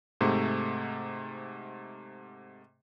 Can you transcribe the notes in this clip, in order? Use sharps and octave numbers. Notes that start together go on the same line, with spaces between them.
G#2 C3 A3